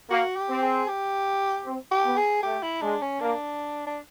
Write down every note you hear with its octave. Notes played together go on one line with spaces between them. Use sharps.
A#3 F#4
G4
C4
G#4
G4
C4
G4
B3
G#4
A3 G4
E4
G#3 D4
C#4
A#3 D4
D4